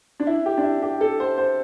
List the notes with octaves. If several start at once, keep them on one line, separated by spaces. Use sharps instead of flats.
D4
E4
G4
D4
E4
G4
A4
C5
C5